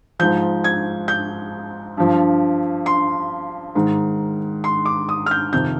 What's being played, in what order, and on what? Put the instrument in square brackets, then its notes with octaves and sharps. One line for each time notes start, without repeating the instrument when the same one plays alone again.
[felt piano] G#2 F3 G6
G#6
G6
G2 F3
C6
G#2 D#3
C6
D6
D#6
F6
G6
F2 C3 D#3 G6